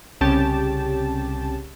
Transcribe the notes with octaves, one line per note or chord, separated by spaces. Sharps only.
C2 C#3 C#4 G4 A5